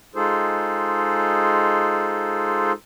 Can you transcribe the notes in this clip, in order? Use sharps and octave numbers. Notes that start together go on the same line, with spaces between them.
G#3 D#4 F4 G#4 A4 C5